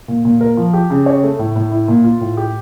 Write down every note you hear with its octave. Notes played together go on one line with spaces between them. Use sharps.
A#2
A#2
A#4
F3
G4
C#3
C#5
A3
A2
A2
E4
A#2
F4
A2
G4